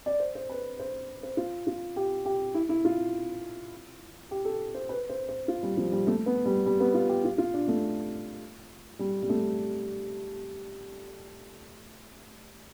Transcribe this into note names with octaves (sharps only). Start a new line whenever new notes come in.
D5
C5
C5
B4
C5
C5
F4
F4
G4
G4
E4
E4
F4
G4
A4
C5
B4
C5
C5
F4
G3
F3
G3
A3
B3
G3
G3
B3
F4
G4
F4
F4
D4
A3
G3
G3
A3